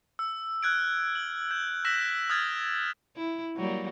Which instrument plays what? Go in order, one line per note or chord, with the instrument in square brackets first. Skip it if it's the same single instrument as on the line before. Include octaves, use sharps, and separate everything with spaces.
[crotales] E6
F6 F#6 G#6 D7
F#7
G6
E6 F#6 A#6 B6 E7 F#7
D#6 F6 G#6 A6
[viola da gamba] E4
F#3 G3 A#3